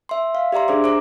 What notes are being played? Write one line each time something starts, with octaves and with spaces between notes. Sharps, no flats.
E5 C6
F5
G4 D5 E5 A#5 C6
D4 G#4 C5 D6
C5 A#5 D6